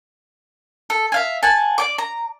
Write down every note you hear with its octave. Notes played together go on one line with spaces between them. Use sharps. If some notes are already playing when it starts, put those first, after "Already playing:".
A4
E5 F5 G#5
F#5 G#5 A5
D5 G5 D6
A#5